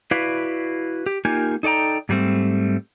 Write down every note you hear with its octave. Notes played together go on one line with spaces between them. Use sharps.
E4 F#4 B4 D5 F5
G4
A#3 D#4 F4 G4 A#4 G#5
D#4 A4 D5 G5 A#5
G#2 F#3 G3 A3 C4